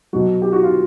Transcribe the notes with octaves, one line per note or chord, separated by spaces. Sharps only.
B2 F#3 F#4
G4
F#4
F4